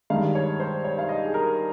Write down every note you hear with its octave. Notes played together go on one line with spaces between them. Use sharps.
G2 D#3 G#3 F5
C#5
C5
C#5
F5
D#5
G#4
A#4